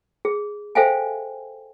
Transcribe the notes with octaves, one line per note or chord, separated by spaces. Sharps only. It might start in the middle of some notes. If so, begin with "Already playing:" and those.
G#4
A4 C5 E5 F5 G5 G#5